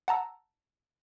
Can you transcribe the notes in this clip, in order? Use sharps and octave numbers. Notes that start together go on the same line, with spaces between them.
F#5 A5 A#5 E6